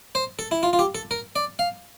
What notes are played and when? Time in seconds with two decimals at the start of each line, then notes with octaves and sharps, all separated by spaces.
0.15 C5
0.39 A4
0.51 E4
0.63 F4
0.73 F4
0.79 G4
0.95 A4
1.11 A#4
1.36 D5
1.59 F5